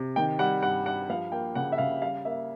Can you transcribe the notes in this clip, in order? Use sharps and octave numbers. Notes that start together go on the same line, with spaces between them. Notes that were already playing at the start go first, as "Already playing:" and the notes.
Already playing: C3
D#3 G5
G3 F#5
G2 F#5
G2 F#5
F3 F5
A#3 G5
C#3 F#5
E5
C#3 F5
G3 F5
A#3 E5